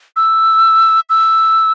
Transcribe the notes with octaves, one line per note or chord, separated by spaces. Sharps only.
E6
E6